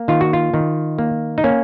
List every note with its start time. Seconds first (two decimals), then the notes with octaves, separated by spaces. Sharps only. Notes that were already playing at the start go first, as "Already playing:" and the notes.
Already playing: A#3
0.08 D#3 F4
0.21 F#4
0.33 F4
0.54 D#3
0.98 A#3
1.38 D#4
1.44 A#3 C#4